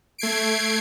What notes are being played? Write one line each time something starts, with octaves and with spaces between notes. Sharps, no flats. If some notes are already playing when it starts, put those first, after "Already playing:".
A3 G#6 C7 D7